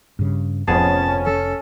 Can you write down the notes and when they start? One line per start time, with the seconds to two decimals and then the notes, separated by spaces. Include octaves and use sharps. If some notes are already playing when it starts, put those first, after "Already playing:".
0.19 G2 C#3
0.68 F1 F2 B3 C#4 G#4 A5
1.26 A4